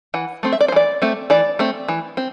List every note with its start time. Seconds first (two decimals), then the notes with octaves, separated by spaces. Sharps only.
0.14 E3 F#5
0.43 A3 C4
0.52 E5
0.61 D5
0.68 C5
0.72 E3 D5
1.02 A3 C4
1.30 E3 D5
1.59 A3 C4
1.88 E3
2.17 C4